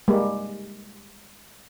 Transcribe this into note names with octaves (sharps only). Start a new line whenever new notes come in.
G3 G#3 A#3